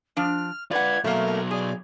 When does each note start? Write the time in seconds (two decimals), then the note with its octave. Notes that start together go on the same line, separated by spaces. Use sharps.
0.17 F3 D4 F6
0.71 F4 B4 D5 F#5 G#6
1.04 B2 F#3 A3 A#3 A#4
1.51 G#4 D5